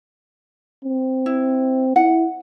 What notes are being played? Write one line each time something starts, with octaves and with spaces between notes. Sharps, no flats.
C4
E4
E4 F#5